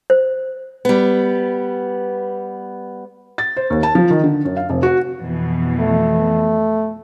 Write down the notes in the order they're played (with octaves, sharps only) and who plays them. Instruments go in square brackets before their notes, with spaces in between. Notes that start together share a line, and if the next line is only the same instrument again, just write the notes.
[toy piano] C5
[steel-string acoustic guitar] G3 B3
[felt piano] A6
C5
D#2
A5
F3
D#3
D3
F#2
F5
F1
F#4
[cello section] F2 B2 E3
[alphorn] A3